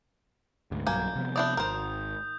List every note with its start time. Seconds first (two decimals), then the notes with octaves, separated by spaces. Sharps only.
0.71 D2 G#2
0.87 B1 G2 F#3 A#3 G#5 G6
1.16 C3 F3 B3
1.36 D4 E4 D5 D#6 G6
1.57 G#1 A#4 C5